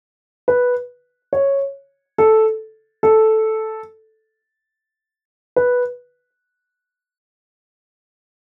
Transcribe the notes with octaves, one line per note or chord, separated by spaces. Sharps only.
B4
C#5
A4
A4
B4